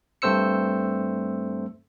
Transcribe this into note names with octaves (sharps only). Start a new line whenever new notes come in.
G2 A3 C4 C5 E6 C#7